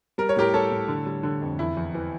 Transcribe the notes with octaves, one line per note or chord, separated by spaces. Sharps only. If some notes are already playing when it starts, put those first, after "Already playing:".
G3 A#4
C#5
A2 G4 A#4
G3 A4 C#5
A2
D3
G3
D3
F2
E2 E4
E2
E3